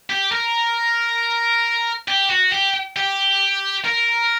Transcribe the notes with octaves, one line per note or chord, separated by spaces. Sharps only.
G4
A#4
G4
F#4
G4
G4
A#4